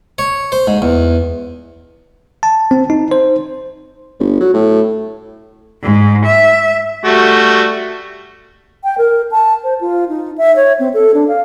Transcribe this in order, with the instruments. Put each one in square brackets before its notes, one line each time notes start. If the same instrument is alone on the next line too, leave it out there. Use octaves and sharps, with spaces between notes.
[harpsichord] C#5
C5
G#2
E2
[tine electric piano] A5
C4
D#4
C5
[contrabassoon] G1
F#3
A2
[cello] G#2
E5
[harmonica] G3 A3 F#4
[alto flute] G5
A#4
A5
C5
F4
D#4
E5
C#5
C4
A4
D4
F5